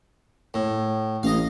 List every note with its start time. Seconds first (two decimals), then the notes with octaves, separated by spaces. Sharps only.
0.54 A2
1.23 A1 D#5 F5